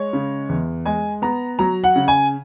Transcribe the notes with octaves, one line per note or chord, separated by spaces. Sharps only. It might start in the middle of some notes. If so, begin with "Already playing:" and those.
Already playing: G#3 C#5
C#3
E2
G#3 G#5
B3 A#5
F#3 A#5
F#5
C#3
G#5